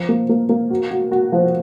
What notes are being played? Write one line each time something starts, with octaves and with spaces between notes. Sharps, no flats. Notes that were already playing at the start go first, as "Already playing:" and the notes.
Already playing: F3
A#3
A#3
A#3
F#4
F#4
F#4
F3